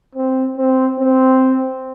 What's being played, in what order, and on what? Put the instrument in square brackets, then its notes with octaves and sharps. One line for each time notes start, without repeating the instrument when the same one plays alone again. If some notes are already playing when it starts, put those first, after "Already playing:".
[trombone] C4
C4
C4